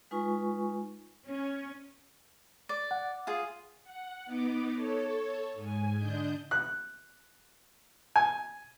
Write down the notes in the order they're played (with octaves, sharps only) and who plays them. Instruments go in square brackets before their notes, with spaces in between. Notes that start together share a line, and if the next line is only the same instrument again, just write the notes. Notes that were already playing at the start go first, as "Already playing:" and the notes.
[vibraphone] G#3 D#4 F4 B4 G#5 C#6
[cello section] C#4
[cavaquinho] D5
[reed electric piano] F#5
[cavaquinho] F4 G#4 G#5
[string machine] F#5
B3 D#4 D6
A4 C#5
G#2 G#5
D3 D4 D#5 G6
[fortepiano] F#6
G#5